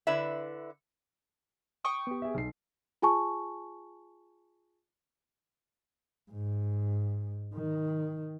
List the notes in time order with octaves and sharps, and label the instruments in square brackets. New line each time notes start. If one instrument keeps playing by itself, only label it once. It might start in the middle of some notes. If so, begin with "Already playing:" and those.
[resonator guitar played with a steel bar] D3 E4 B4 D5 E5
[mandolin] G5 C#6 D#6
[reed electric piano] B3 G4
[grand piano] G#4 E5
B1 C7
[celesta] F4 G#4 G#5 A5 C#6
[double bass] G#2
D#3